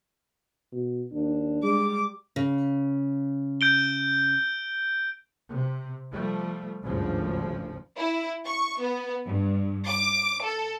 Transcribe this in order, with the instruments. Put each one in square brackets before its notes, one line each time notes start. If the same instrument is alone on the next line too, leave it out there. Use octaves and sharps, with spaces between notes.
[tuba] B2
[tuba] D#2 [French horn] D4
[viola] G3 D6 [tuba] G#3
[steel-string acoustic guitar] C#3
[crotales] G6 D7 G7
[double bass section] C3
F3 G3 A3
G#1 D2 G2 C#3 F3
[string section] E4
C#6
B3
G2
D6
A4